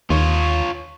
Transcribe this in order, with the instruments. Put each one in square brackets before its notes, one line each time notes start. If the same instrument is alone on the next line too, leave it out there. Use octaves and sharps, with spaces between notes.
[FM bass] D#2 [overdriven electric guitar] F4 C#5